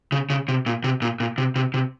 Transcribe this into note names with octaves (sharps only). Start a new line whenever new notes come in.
C#3
C#3
C3
A#2
C3
A#2
A#2
C3
C3
C3